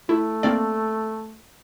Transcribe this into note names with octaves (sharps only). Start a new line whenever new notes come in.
A3 E4
A#3 C4 D5